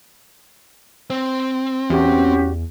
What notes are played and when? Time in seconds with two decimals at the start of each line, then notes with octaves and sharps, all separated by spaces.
1.10 C4
1.90 E2 C#4 F#4 G4